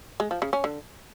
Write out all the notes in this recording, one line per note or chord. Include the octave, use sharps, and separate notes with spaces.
G#3
F3
C#3
C#4
D3